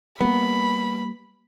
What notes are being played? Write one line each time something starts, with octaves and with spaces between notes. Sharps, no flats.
G3 A#3 B3 B5